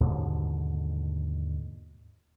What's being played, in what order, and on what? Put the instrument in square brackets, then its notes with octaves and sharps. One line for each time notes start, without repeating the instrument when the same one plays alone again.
[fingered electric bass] D#2 G#2 B2 D3